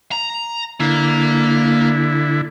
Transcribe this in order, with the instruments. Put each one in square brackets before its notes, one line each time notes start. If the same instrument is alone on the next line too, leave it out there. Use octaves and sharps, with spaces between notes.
[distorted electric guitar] A#5
[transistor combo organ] D3 E4 [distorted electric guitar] A#3